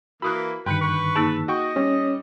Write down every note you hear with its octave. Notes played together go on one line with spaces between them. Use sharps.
E3 A#3 F#4 B5 D#6 F#6
G2 D3 D#3 B4 G5 C6 F#6 C#7
B4 C#6
A#3 D#4 G#4 A5 E6
F#4 D#5 G5 C#6
G3 C#4 C#5